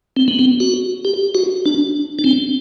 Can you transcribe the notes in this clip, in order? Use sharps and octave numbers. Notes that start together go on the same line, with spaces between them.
C4
B3
C4
F#4
G4
F#4
D4
D4
C4